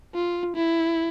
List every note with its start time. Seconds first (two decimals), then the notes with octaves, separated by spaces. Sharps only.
0.14 F4
0.56 E4